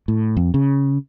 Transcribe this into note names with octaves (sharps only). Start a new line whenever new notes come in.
A2
F2
C#3